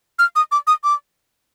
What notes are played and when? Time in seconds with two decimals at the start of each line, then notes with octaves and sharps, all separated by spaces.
0.19 F6
0.36 D#6
0.52 D6
0.67 D#6
0.84 D6